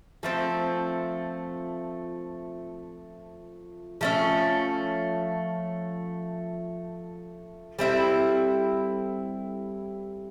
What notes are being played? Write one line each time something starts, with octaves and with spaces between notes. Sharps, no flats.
F3 A3 C4
F3 A3 C#4
G3 C4 E4 A4